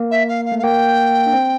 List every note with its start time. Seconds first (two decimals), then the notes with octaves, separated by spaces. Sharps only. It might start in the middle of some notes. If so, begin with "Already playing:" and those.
Already playing: A#3
0.11 E5
0.29 F5
0.46 F5
0.52 A3
0.59 F5
0.63 A#3 G5
1.27 D4
1.33 C4